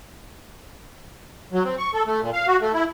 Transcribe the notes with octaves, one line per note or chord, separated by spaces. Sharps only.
F#3
C4
C#6
A4
A3
A#2
F5
F#4
A3
E4